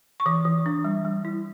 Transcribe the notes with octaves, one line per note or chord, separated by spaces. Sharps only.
C#6
E3 D6
E3
D4
G3
G3
E4